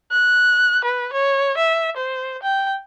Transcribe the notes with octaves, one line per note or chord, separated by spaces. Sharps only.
F#6
B4
C#5
E5
C5
G5